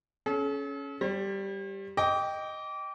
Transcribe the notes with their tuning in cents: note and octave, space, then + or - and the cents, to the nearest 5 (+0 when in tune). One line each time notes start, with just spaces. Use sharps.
C#4 +5 A4 -45
G3 +0 C5 +45
D#5 +0 G5 +0 D6 -25